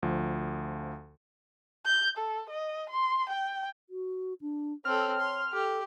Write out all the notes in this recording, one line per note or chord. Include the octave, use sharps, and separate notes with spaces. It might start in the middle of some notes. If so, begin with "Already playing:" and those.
D2 F3
G6
A4
D#5
C6
G5
F#4
D4
C4 A4 C#5 F6
C6
G4 A4